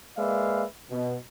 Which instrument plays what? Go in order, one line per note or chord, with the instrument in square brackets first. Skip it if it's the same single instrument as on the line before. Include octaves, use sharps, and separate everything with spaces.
[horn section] G#3 A#3 B4 D5 E5 F5
B2